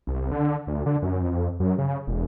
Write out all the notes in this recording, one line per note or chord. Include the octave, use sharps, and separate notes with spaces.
C2
D3
D2
D3
F#2
F2
F#2
C#3
E1